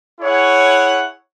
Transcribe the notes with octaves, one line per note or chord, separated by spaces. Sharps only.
E4 G#4 C#5 F#5